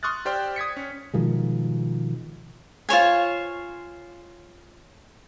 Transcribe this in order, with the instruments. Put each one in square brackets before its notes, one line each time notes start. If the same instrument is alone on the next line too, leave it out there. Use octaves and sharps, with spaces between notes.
[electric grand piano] C6 C#6 D#6 F6 F#6 A6
G4 C5 D5 G5 C6 F6
D#6 G#6 B6 C#7
C#4
[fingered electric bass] B2 D#3 F3 G#3
[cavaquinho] F4 C5 C#5 G#5